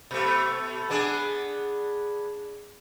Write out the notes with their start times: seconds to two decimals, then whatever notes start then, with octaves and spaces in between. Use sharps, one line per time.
0.11 B2 A3
0.90 B3 D4 G#4